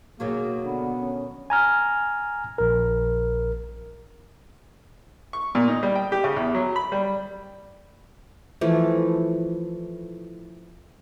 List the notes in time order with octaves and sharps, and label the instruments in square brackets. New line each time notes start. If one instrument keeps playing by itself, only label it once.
[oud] B2 D#3 F#3 [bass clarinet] A#3 [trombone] G#4
[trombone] D3 [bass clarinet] B3
[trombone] C#4
[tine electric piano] G#5 A#5 F6
A#1 A#4
[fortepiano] C#6
A#2
D#4
G3
G5
G4
C#3
E2
F#3
B5
G3
[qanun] E3 F3 A3